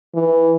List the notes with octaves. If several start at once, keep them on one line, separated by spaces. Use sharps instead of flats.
E3